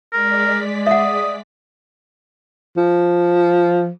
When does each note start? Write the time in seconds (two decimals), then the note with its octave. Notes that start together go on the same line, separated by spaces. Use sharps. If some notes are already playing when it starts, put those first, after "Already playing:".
0.13 G#3 A#4 D5 B6
0.87 E5 F#5 D#6
2.77 F3